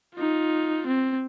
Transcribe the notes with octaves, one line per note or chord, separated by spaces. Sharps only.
D#4 F4
C4